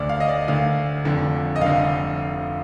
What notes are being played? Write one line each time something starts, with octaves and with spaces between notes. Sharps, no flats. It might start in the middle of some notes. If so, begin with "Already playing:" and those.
Already playing: D2 D3 D5
F5
D#5
D5
D2 D3 F5
F1 F2 D3
D#5
F1 D3 F5